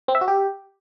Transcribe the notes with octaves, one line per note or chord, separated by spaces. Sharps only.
C4
E5
F#4
G4